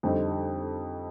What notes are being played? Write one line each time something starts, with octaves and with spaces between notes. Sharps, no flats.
F2 D3 G3 C4 D#4